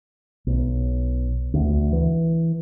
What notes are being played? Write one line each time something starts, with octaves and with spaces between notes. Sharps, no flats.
B1
D2
E3